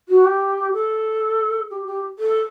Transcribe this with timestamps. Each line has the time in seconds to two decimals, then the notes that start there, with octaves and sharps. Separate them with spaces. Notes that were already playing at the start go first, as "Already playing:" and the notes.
0.08 F#4
0.24 G4
0.73 A4
1.70 G4
1.86 G4
2.19 A4